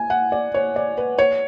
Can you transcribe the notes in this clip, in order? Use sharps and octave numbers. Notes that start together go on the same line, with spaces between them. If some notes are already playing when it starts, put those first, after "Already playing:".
Already playing: G#5
F#5
D5
C#5
D5
B4
C#5